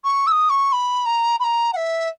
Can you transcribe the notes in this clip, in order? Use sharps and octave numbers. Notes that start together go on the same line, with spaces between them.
C#6
E6
D#6
C#6
B5
A#5
B5
A#5
F#5
E5